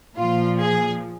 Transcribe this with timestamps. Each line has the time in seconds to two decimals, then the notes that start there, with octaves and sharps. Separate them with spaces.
0.16 A#2 F3 F4
0.59 G#4